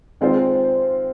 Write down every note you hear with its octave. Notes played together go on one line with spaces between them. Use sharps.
D#3 G#3 C4 F4 C5